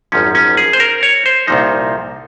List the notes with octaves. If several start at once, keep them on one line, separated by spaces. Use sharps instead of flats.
G#1 F#2 F3 C#4
C#4
G#4
C5
A#4
C#5
C5
C2 A#2 F3 D#4